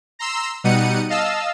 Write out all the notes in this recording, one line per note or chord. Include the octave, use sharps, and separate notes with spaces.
A#5 C6 E6
B2 G3 D#4 F#5 C#7 D#7
D#5 F5 A5 E6